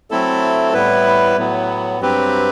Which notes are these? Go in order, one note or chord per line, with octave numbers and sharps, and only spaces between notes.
F#3 A3 C4 E4 A4
A2 G3 B3 E4 B4
A2 F#3 B3
G2 F#3 C4 G4 B4